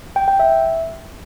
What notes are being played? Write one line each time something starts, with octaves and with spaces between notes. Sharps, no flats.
G5
G5
E5